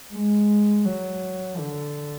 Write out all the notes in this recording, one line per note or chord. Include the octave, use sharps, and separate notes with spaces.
G#3
F#3
D3